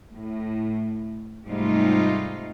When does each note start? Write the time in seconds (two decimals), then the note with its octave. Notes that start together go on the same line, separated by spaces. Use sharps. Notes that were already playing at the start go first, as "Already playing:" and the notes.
0.12 A2
1.46 G#2 C3 G3 A3 D#4 F4